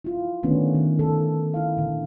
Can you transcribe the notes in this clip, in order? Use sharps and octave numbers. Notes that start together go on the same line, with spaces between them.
E4 F4
D3 D#3 A3 B3 C#4 D4
D#3
D#3 A4
E4 F5
A#2 D3